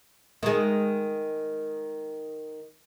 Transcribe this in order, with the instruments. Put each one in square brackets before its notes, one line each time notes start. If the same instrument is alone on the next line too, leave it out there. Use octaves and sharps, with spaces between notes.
[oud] D#3 G#3